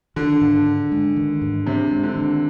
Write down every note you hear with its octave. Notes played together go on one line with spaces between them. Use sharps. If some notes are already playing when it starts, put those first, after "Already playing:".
D3 D#3
G#2
D4
G#3
D#3
G#2
C3 D4
G#3
D3
D#3